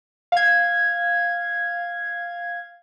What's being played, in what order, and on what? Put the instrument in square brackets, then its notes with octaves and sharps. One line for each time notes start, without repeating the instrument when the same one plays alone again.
[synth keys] F5 G#6